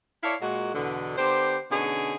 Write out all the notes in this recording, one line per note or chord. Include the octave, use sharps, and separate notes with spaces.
E4 A4 C#5 D5 E5 F5
A#2 G#3 F#4
E2 B2 D3
D3 B3 G4 C5
B2 D3 C#4 D#4 G#4